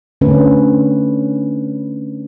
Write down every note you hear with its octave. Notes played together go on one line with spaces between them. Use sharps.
D3 A3 C4 C#4 A4 B4